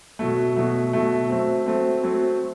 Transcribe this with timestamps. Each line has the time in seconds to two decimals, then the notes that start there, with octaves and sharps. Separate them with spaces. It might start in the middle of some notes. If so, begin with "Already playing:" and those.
0.19 B2 F#3 A3
0.56 B2 F#3 A3
0.93 B2 F#3 A3
1.30 F#3 A3 C4
1.66 F#3 A3 C4
2.03 F#3 A3 C4